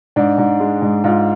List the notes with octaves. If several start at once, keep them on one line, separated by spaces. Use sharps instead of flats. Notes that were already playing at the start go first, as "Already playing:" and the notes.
G#2 D4
G#2
G#3
G#2
G#2 F4